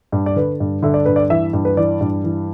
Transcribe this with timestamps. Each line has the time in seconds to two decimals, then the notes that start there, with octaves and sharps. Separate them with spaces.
0.12 G2
0.26 D5
0.36 D3 B4
0.60 G2
0.83 D3 E5
0.94 D5
1.05 G2 B4
1.16 D5
1.30 E3 E5
1.53 G2
1.65 B4
1.77 E3 D5
2.01 G2
2.24 E3